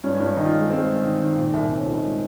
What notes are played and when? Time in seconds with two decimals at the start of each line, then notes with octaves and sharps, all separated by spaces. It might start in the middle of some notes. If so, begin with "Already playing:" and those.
0.04 G2 C#4
0.15 C#4
0.20 G2
0.26 C#4
0.37 D#3 D#4
0.45 F4
0.53 G#3
0.70 G#3 C4
0.86 G#3
1.03 D#3
1.20 D#3
1.36 A#2
1.53 C2
1.69 C2 C4
1.78 C#4
1.86 C2 F4
1.95 D#4
2.03 G#3